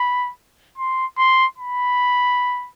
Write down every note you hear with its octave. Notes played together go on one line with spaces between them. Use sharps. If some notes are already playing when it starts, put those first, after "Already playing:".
Already playing: B5
C6
C6
B5